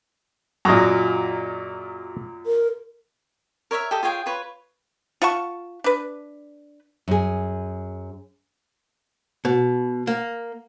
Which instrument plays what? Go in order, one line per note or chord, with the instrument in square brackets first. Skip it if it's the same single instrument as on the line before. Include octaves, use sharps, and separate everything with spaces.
[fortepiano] F#2 A#2 [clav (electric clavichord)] F#4 G#4 D#5
[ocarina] A#4
[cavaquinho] A#4 C#5 D#5 E5
G4 A4 D#5
F4 G#4 C#5 G5
F4 B4 C#5
[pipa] F4 F#5 A5 C#6
D4 B4
[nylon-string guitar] F#2 G#4
[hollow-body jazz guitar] B2
A#3